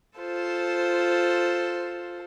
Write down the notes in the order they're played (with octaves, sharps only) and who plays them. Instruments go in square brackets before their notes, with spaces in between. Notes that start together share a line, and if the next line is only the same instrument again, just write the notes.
[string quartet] F4 A4 C5